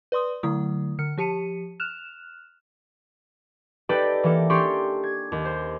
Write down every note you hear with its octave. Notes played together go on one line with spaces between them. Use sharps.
B4 D5 C6 D#6
D3 F#3 A3 E4 D#6
D3 F6 C#7
F3 G4 A5 C#7 D#7
F6 F#6 E7 F7
D#4 G4 A4 B4 D5 G5
E3 A#3 A4
C#4 D4 G4 G5 C6 C#6
G#6
D#2
C5